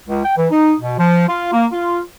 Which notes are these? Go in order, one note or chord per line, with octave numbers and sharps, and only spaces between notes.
C#2
G5
E3
D#4
B2
F3
F4
A#3
F4